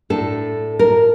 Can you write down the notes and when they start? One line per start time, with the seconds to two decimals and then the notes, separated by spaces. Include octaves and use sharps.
0.10 A2 A3 D4 A4
0.79 A#4